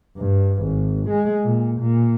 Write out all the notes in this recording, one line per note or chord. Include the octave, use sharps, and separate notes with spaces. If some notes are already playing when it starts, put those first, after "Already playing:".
G2
G#1
G#3
A#2
A#2